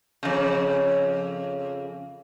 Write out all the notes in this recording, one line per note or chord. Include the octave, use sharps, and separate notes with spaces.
F2 C#3